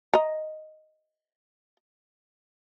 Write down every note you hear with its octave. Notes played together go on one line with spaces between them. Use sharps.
D#5 A#5